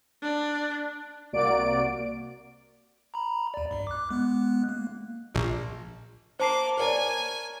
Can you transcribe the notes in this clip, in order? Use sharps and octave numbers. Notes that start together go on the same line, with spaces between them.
D4
C2 C3 A#3 F#4 D5 D7
A#5 B5
D#2 D5
C2 G2
D6 F#6
G#3 B3 F#6
A#3
A#1
A#3 C5 A5 D6 C7
A#4 C#5 D5 G#5